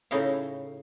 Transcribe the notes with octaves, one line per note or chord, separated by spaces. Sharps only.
A2 C#3 D#4 E4 F5